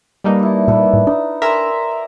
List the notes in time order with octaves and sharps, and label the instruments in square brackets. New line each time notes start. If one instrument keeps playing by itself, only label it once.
[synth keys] G3 A#3 D#4 [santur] A4 B4
[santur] D4 E4
[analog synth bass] A#2 [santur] A4 B4 B5
[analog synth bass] A2
[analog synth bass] D4 [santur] D#4
[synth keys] A#4 E5 A#5 [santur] D5 G#5 C6